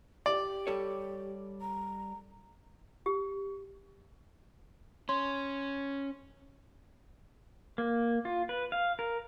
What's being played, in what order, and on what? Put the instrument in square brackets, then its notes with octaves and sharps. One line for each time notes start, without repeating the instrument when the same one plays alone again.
[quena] G4 [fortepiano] D5
[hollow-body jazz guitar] G3 A4 C#5
[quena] A#5
[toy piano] G4
[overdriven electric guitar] C#4 [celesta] C6
[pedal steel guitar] A#3
F4
B4
F5
A#4